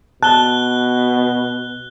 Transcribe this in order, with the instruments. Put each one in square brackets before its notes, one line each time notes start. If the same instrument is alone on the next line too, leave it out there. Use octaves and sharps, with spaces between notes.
[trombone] B2 [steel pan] A5 [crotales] F#6 G7